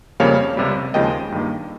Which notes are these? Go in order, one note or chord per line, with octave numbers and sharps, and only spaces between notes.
F2 C#3 G3 A#3 C#5 F5
C#2 C3 G3
D#2 C#3 F3 G#3 D#5 G5
G2 D#3 A#3